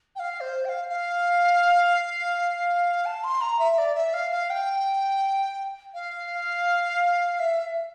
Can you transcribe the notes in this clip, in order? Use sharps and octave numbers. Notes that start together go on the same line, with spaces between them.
G5
F5
C5
G5
F5
F5
A5
C6
A#5
E5
D5
E5
F5
F5
G5
F5
E5